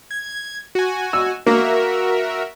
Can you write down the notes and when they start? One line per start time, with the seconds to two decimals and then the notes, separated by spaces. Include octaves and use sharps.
0.11 G#6
0.75 F#4 G#5
1.13 E6
1.46 A#3 F#4 A#4 E5